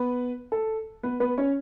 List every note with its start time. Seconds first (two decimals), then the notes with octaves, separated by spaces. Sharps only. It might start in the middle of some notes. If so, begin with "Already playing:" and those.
Already playing: B3 B4
0.52 A4
1.03 B3 B4
1.20 B3 B4
1.38 C#4 C#5